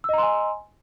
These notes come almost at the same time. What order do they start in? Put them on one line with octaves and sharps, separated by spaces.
E6 D#5 A#5 C6 G#5